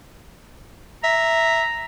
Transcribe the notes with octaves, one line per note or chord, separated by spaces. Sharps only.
E5 A#5